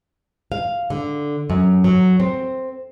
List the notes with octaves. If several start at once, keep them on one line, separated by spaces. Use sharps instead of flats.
F5
D3
F#2
F#3
C4